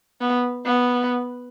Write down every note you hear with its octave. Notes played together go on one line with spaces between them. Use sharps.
B3
B3